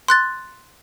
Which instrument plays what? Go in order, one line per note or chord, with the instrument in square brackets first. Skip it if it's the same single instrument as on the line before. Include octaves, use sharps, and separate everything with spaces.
[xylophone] C6 F#6 A6